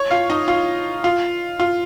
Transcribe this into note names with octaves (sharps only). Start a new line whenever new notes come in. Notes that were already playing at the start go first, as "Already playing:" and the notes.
Already playing: C#5 C#6
F4 F5
D#4 D#5
F4
F4
F4